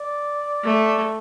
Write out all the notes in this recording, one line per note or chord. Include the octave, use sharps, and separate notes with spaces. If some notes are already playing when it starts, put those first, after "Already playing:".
Already playing: D5
A3